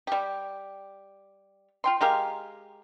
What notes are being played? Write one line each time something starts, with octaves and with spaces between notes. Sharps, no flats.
G3 G4
F4 G5 C6
G#3 G4 A#4 F5